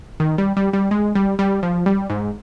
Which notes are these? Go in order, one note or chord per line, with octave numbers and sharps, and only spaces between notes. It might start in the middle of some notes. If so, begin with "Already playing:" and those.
D#3
G3
G3
G3
G#3
G3
G3
F3
G3
G#2